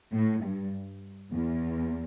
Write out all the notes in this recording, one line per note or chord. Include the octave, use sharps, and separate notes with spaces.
A2
G2
E2